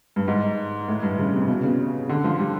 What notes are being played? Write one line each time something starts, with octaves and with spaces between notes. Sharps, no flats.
G2
G#2
A2
G2
C#3
C3
B2
C#3
D3
F3
G3